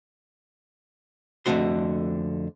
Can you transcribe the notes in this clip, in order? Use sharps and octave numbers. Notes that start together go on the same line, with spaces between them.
F2 D3 F3 A3 F#4 C6